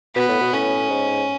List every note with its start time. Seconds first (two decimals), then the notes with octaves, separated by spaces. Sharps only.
0.16 B2 B3
0.28 A2
0.41 B2
0.52 A2 C#4
0.90 G#2